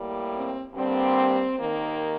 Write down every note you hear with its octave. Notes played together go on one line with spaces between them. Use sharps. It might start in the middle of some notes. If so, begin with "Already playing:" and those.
Already playing: A2 G3 A#3
C4
G2 D3 G3 A#3 C4
D#2 D#3 A#3